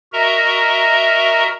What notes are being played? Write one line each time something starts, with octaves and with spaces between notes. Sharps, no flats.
F#4 A#4 D#5 E5 A#5